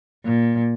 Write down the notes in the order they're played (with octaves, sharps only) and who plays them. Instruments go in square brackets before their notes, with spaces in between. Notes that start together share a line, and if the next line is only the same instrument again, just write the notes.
[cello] A#2